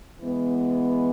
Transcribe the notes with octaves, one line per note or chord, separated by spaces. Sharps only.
E3 G#3 B3